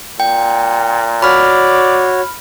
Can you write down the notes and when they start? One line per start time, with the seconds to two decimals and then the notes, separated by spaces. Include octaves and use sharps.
0.20 A#2 G5
1.22 F#4 C#5 D5 B5 F6